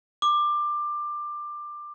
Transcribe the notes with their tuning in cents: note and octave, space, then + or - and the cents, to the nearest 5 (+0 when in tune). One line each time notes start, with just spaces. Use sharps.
D6 +20